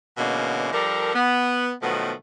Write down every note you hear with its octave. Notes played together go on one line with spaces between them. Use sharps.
B2 D3 E3 G#3 A#3 C#4
F3 G3 D4 A4 A#4
B3
B2 D#3 F3 F#3 A3 B3